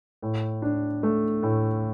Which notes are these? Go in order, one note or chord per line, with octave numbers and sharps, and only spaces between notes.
A2
D4
A3
A2